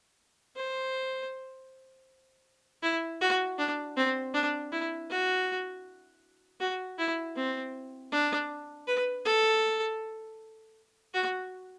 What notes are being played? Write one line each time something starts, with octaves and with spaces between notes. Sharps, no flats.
C5
E4
F#4
D4
C4
D4
E4
F#4
F#4
E4
C4
D4
B4
A4
F#4